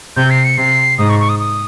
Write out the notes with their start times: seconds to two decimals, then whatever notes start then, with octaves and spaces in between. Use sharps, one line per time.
0.16 C3 G6
0.30 C7
0.44 C#7
0.58 C3 C7
0.98 G#2 D#6
1.09 C#6
1.20 C#6
1.29 D#6
1.40 D#6